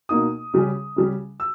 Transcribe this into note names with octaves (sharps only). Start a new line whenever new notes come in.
B2 A#3 D#4 D#6
C#3 G3 C#4
C#3 G3 C#4
E6